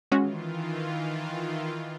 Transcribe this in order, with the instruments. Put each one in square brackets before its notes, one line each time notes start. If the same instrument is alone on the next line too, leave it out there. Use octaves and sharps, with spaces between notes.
[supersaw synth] D#3 E3 F4 [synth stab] G#3 C#4 F#4